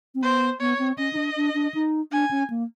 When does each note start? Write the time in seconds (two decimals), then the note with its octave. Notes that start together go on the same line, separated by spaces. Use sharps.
0.15 C4
0.22 B3 C5
0.60 B3 C#5
0.79 C4
0.98 C#4 D#5
1.13 D#4
1.17 D4
1.36 D4
1.54 D4
1.74 D#4
2.11 D4 G#5
2.31 C#4
2.50 A#3